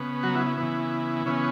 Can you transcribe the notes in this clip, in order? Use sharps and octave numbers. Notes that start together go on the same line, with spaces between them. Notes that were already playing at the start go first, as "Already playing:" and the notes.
Already playing: C#3 B3
F#3 F#4
E4
E4
C#3 E3 B3
C#3 E3 B3 C#4